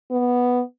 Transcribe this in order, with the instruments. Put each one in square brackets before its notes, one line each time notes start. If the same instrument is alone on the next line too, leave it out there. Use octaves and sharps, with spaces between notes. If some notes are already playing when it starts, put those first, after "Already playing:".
[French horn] B3